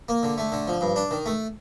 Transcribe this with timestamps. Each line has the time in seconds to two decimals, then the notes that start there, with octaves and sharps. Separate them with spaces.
0.09 A#3
0.23 D3
0.38 A3
0.52 D3
0.68 F3
0.81 G2
0.96 D4
1.11 D#3
1.26 A3